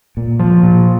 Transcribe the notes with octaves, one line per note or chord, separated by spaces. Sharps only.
A#2
F3
A#2